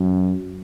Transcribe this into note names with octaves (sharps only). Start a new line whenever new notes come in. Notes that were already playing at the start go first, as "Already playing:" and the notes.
Already playing: F#2